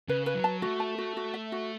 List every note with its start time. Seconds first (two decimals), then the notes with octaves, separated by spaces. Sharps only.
0.09 C#3 B4
0.26 B4
0.35 F#3
0.44 A5
0.62 A3 F#4
0.80 A5
0.98 F#4
1.17 F#4
1.34 E5
1.52 F#4